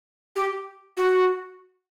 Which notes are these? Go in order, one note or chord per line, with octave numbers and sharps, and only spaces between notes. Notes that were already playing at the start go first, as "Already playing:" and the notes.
G4
F#4